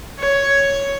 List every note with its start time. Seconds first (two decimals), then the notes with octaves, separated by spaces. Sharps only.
0.20 C#5